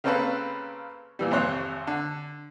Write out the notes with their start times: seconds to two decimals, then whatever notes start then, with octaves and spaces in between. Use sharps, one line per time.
0.04 C#3 A#3 C4 C#4 A4 B4
1.19 A#2 E3 G3
1.31 G#1 F2 C3 C5 C#5 F#6
1.87 D3